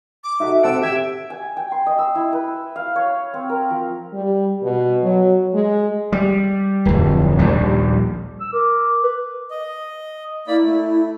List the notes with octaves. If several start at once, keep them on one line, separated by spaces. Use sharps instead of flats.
D6
D#4 F#4 A4 E5
C4 A4 F#5 E6 D7
G4 E5 G#6
G#5
G5
C6
D#5
E6
E4
B4
F5
C#5
C4
A#4
F3
G3
B2
F#3
G#3
G3
D1 F2
A#1 D#2 G3
E6
A#4 D6
B4
D#5
A#3 E4 D5 B5
A3